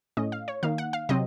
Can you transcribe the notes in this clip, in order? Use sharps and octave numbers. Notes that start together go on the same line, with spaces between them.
A2 A3 C#4 D#5
F5
C#5
D#3 A#3 D#4 F5
F#5
F5
C3 F#3 C4 D#5